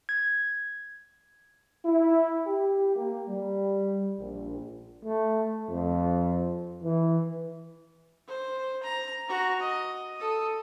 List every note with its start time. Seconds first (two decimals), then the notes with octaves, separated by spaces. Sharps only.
0.09 G#6
1.85 E4
2.47 G4
2.96 A#3
3.29 G3
4.19 A#1
5.04 A3
5.69 F2
6.83 E3
8.28 C5
8.83 A#5
9.28 F#4 A#5
9.60 D#5
10.17 A4 D#6